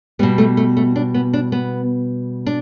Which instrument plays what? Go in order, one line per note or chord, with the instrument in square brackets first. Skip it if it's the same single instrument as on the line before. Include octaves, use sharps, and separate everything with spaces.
[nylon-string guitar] B2 G3 B3
A3
A3
A3
D4
B3
D4
B3
D4